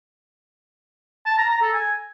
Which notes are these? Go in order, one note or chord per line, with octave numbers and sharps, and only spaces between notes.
A5
A#5
A#5
A4
G#5